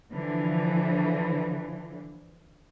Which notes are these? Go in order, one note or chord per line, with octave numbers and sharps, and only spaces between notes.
D3 E3 F3